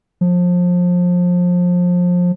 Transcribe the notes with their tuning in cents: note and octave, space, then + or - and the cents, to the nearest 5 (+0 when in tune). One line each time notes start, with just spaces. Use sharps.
F3 +25